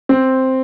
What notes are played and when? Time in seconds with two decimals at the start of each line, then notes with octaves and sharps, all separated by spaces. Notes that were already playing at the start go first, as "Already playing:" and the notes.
0.09 C4